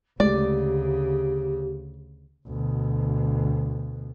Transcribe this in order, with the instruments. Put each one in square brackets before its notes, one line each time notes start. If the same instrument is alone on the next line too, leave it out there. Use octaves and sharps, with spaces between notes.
[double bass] D2 C#3 [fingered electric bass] G#3 A3 [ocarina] G4 [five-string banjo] D5
[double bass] D2 B2